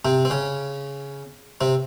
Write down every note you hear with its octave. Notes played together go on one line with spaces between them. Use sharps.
C3 C4
C4
C#3 C#4
C3 C4